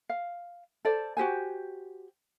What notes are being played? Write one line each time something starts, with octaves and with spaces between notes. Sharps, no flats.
F5
A4 C5 D5
F#4 G4 C5 G#5